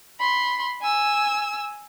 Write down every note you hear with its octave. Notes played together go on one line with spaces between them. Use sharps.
B5 C6
G#5 E6